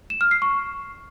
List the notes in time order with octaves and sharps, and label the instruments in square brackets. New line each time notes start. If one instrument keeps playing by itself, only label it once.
[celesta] E7
F6
C7
C#6